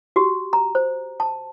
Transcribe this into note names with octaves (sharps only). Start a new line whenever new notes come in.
F#4 G4
A#5
C5
A5